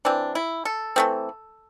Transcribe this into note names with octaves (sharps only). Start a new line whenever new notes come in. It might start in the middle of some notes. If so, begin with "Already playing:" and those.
E3 C4 D4
E4
A4
E3 A3 C4